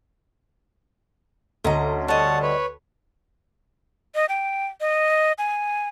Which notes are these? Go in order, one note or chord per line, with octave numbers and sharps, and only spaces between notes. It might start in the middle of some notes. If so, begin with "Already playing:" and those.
D2 C#4 D#5 A#5
G3 C#5 D#5 F#5 A5
B4 C#5
D#5
G5
D#5
G#5